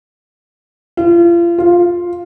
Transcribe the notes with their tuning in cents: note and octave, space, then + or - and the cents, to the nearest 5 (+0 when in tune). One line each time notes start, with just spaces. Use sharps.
F4 -35
F4 +5